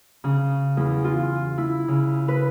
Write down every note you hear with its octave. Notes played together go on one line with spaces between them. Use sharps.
C#3
E2
F4
E4
C#3
B4